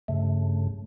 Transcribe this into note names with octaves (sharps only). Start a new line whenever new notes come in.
G2 C#3 A3